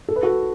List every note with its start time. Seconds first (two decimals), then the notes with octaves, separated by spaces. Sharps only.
0.09 A4
0.16 B4
0.23 F#4 A4